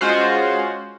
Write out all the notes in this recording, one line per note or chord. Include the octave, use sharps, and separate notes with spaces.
G#3 C#4 F4 F#4 C5